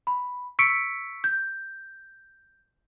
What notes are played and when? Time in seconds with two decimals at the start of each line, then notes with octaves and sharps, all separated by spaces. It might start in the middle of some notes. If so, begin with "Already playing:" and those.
0.07 B5
0.59 C#6 E6 B6 C#7 D7
1.24 G6